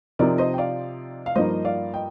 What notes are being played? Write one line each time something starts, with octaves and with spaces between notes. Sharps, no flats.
C3 F3 C4 D#4 A#4 D5
C5 D#5
G5
D5 F5
F5
G2 F3 A#3 D#4 C5 D#5
D5 F5
D#5 G5